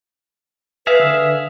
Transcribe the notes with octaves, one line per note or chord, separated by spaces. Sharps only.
G#4 B4 E5 F5
D3